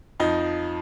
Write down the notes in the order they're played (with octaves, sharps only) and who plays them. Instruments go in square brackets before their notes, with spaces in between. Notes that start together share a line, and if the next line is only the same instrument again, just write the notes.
[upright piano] F2 F3 D#4